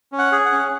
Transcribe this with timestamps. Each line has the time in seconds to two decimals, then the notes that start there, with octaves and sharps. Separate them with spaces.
0.12 C#4
0.18 F#5
0.32 G#4
0.45 F#5
0.52 C#4